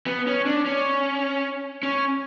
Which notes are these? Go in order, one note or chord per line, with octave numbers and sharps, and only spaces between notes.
B3
C#4
D4
C#4
C#4